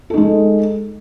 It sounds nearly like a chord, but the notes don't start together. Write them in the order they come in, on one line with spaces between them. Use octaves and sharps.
A4 D#4 G#3